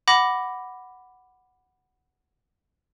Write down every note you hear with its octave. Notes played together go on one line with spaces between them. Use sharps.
F#5 B5 D6 A#6